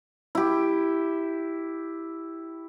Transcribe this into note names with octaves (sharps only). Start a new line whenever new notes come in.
E4 G4